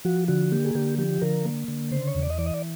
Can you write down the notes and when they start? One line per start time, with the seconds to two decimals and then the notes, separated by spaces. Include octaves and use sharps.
0.05 F3 F#4
0.28 D3 F#4
0.52 A#3 G4
0.65 G#4
0.75 D3 G4
0.98 F3 G4
1.21 D3 A#4
1.45 A#3
1.68 D3
1.91 C#3 C5
2.07 C#5
2.15 E2
2.23 D5
2.30 D#5
2.38 E3 D5
2.46 D#5
2.54 D5